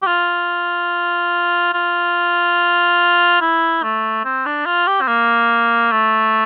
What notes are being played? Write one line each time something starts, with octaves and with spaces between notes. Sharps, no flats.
G4
F4
F4
E4
A3
C4
D4
F4
G4
C4
A#3
A3